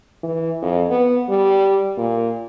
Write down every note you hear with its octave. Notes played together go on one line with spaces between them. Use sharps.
E3
F2
B3
G3
A#2